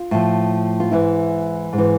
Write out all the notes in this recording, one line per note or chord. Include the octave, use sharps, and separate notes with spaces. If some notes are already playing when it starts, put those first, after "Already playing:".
Already playing: F4
A2 F3
F4
G#2 E3 E4
G#2
E3